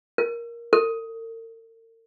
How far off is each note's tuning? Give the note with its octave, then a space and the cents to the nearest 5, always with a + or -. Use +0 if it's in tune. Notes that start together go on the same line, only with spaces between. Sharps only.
A#4 +10
A#4 -45